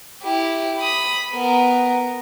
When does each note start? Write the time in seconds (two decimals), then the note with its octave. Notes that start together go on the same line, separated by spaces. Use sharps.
0.23 E4 G4
0.79 B5 D#6
1.34 B3 A#4